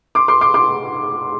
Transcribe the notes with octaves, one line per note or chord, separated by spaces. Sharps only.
C6 D6
C6 D6
C6 D6
C6 D6